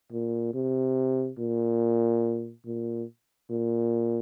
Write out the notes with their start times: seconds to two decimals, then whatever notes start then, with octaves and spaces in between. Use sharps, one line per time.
0.12 A#2
0.54 C3
1.39 A#2
2.66 A#2
3.50 A#2